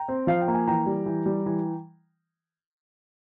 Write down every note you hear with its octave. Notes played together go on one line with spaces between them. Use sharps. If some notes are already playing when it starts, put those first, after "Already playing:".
Already playing: G5 A#5
C4
F3 F5
G5
A#3
G#5
E3 G5 A#5
G3
E3
G3
E3